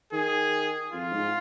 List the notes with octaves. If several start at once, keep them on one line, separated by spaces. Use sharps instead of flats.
D#3 G#4
F2 F4
G#2